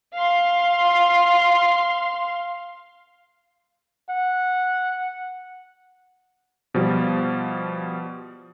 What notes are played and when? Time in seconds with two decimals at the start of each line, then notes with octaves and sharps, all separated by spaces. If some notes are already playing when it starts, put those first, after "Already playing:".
0.14 F5 C6
4.10 F#5
6.74 B2 F3 G3